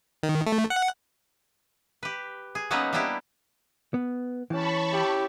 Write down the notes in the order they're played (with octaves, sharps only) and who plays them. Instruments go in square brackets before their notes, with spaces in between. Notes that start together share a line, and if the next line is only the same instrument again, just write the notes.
[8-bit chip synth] D#3
A3
F#5
[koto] G4 B4
G#4
F#3 A#3 B3 C#4 D#4 B4
G3 A#3 B3 D4 E4 G4
[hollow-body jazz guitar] B3
[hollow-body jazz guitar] E3 [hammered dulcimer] C#4 G4 [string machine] A5 B5 C#6
[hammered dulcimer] E4 [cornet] G4